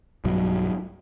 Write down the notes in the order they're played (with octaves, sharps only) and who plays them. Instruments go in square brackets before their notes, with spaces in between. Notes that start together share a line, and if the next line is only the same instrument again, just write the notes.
[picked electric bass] B1 G2 F#3